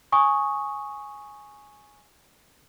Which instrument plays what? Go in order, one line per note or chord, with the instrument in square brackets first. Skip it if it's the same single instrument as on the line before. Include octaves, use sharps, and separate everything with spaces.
[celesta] G#5 C#6 D#6